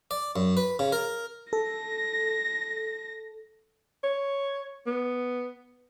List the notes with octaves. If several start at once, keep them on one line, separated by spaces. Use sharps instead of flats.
D5
F#2
B4
C#3
A#4
A4 A#6
C#5
B3